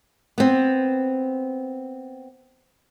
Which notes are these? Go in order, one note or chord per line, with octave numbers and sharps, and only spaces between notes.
B3 C4